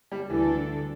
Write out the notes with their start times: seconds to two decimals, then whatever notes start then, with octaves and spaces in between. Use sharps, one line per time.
0.12 G3
0.29 D2 D3 E3 G3 D4 A4